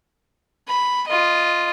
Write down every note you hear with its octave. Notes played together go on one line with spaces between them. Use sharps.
B5
F4 D#5